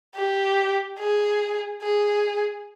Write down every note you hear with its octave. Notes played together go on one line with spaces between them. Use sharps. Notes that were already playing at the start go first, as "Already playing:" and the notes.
G4
G#4
G#4